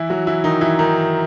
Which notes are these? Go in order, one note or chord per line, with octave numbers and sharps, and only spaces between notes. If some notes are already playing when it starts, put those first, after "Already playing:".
Already playing: E3 E4
F#3 F#4
E3 E4
D#3 D#4
E3 E4
D#3 D#4